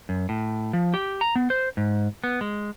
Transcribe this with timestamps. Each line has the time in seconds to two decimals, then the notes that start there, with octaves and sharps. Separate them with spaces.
0.09 F#2
0.29 A2
0.73 F3
0.94 G4
1.21 A#5
1.36 B3
1.50 C5
1.77 G#2
2.24 B3
2.41 G#3